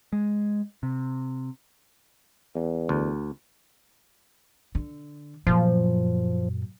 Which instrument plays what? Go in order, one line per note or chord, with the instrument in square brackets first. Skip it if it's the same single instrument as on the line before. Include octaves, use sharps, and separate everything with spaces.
[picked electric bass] G#3
C3
[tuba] E2
[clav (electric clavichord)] D2
[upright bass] D3
[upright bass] F#2 A#2 [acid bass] F3